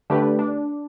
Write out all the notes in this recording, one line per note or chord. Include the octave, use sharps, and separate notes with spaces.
D3 A3 D4 G4 B4
D4